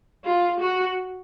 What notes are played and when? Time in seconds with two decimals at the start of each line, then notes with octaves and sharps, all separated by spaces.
0.24 F4
0.60 F#4